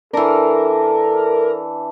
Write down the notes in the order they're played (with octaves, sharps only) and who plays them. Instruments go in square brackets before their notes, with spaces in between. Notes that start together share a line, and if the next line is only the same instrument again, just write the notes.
[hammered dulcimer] E3 D4 [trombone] A4 [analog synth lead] A#4